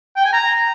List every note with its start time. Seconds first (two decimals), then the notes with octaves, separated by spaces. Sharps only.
0.16 G5
0.25 G#5
0.33 A#5